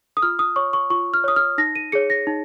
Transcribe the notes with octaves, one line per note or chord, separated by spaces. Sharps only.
D#6
F4 F6
D#6
C#5 C#6
C#6
F4 C#6
F6
C#5 D#6
F6
D#4 A#6
D#7
G#4 C#5 C#7
A#6
D#4